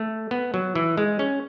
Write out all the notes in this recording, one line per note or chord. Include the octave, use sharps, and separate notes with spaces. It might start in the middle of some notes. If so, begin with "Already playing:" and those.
Already playing: A3
B3
F#3
E3
G#3
C#4